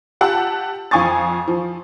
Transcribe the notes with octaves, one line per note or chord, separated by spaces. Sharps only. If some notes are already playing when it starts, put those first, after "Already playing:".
F4 G4 F#5 A5 E6
F2 F5 G#5 C#6 D#6 A6
F3